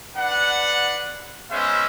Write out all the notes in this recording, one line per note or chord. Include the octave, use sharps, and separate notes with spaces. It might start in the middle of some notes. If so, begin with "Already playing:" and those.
D4 B4 F#5
G#3 B3 C#4 C5 E5